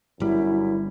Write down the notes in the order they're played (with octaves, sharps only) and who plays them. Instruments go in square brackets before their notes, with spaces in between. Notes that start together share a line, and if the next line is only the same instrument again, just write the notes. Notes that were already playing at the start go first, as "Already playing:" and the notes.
[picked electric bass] G1 G3 [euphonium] F#2 [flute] E4